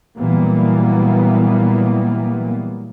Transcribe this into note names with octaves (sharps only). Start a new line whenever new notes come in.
A#2 E3 F#3 G3 A#3 B3